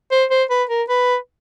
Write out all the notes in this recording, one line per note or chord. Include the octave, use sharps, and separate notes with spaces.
C5
C5
B4
A#4
B4